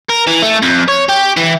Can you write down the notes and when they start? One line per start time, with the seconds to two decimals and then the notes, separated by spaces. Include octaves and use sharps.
0.10 A#4
0.27 E3
0.43 A3
0.63 F2
0.88 C#5
1.09 G4
1.37 E3